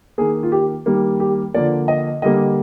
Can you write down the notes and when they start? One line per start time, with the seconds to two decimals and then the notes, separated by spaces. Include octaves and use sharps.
0.18 D#3 A#3 G#4
0.43 F4
0.52 G4
0.86 D#3 G3 A#3
1.20 G4
1.54 D3 F3 A#3 D5
1.88 D#5
2.22 D3 G3 A#3 D#5